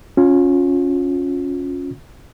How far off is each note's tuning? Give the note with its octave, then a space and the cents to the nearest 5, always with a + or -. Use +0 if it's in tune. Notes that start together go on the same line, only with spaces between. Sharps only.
C#4 +0 F4 +30